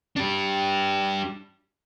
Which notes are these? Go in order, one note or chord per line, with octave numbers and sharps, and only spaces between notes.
D4 G4